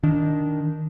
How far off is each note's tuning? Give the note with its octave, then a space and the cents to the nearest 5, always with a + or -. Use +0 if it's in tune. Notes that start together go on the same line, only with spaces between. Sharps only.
D#3 +0 D4 -10